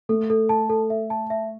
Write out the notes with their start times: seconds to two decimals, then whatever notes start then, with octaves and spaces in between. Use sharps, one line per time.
0.09 A3 A4
0.30 A4
0.49 A5
0.70 A4
0.90 E5
1.10 A5
1.30 E5